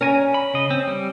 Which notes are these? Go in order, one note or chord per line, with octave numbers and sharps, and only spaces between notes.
C#4 A#4 G#5 A#5
B5
C#3 D#5
C4
G3